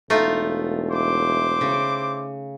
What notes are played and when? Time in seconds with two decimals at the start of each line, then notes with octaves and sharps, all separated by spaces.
0.10 E1 A3 D#4 F4
0.91 E4 C5 D6
1.61 C#3